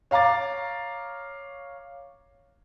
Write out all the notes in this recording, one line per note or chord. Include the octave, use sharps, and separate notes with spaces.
C#5 F5 A#5 D6 A6